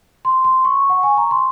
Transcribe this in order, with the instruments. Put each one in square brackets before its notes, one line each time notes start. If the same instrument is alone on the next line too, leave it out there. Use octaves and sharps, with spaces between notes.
[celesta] C6
C6
C#6
F#5
G#5
A#5
C6